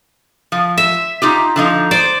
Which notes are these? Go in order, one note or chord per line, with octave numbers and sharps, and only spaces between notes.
F3
E5
D#4 F4 G4
D3 F3 D#4
C5 D5